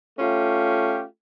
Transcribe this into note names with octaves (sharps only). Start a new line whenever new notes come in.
A3 C#4 F4 G4